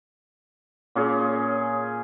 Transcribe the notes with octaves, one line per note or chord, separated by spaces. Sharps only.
A#2 C#4 G#4